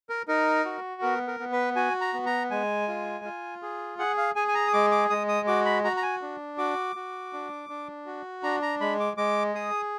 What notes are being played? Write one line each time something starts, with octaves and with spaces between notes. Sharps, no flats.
A#4
D#4 A#4
F#4
B3 A#4
A#4
B3
B4
F#4 G#5
A#5
B3
A#5
G#3 G#5
F4
F4
G#4
G#4 F#5
F5
G#4 G#5
G#5
A#5
D#6
G#3 D6
D6
G#3 D#6
D#6
F#4 D6
B5
F#4 A#5
A#5
G#5
D4
F#4 D6
F#4
D4
D4
F#4
D4 A#5
A#5
G#3 B5
D6
G#3 D6
G#4 D#6